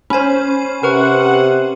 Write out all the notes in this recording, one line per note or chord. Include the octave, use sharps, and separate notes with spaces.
C#4 C5 G#5 B5
C3 A#4 B4 F#5 C#6